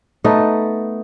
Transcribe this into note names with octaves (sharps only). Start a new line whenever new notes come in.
A3 B3 D#4